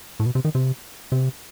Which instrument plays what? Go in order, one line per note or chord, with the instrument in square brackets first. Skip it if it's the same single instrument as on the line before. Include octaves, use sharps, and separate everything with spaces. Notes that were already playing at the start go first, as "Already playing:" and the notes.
[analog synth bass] A2
B2
C3
D#3
C3
C3